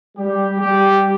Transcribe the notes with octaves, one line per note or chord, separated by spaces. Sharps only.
G3 G4
G3 G4